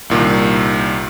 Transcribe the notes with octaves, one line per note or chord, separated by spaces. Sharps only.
C2 A#2 D#3